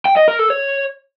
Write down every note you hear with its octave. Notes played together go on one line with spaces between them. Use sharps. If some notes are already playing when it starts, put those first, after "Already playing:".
G5
D#5
A#4
A4
C#5